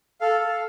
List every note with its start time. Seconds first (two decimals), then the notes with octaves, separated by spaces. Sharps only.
0.21 A4 F5
0.41 A4